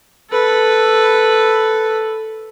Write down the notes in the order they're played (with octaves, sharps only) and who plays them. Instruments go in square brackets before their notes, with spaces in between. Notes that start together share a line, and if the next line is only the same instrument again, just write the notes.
[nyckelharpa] A4 B4